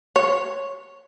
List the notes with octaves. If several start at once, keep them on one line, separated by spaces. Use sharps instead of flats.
C#5